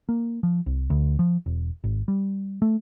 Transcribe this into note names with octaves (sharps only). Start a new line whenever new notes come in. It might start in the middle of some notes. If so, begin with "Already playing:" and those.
A#3
F3
C2
D2
F3
E1
G#1
G3
A3